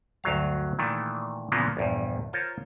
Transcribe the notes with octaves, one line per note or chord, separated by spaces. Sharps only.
D2 G2 F#3 F5
A#2 D#3 E3 A3
A#2 C#3 E3 F3 A#3 B3
A#1 E2 G2
F4 A#4 C5 C#5